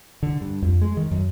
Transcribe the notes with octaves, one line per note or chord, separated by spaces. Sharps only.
D3
G2
F2
G#3
D#3
F#2